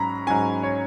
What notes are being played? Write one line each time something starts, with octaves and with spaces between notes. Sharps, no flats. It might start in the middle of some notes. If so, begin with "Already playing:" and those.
Already playing: G#2 F#3 C#4 A#5 B5
G#2 F#3 C#4 G#5
C#5